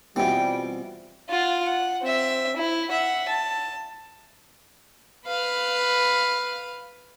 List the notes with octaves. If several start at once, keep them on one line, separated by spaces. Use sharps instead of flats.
B2 E3 G3 C4 F4 G5
F4 F#5
F#5
C4 E5
E4
E5 F#5
A5
B4 F5